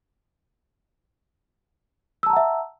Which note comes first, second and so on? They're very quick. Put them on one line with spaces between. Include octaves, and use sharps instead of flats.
E6 A5 A#5 F#5 E5